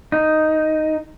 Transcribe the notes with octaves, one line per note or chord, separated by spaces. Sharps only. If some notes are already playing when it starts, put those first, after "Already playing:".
D#4